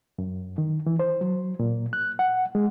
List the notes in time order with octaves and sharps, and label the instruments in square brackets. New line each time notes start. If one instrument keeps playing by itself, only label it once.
[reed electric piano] F#2
D#3
E3
C5
F#3
A#2
F#6
F#5
G#3